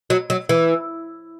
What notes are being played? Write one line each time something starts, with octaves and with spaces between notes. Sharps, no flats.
F#3
F#3
E3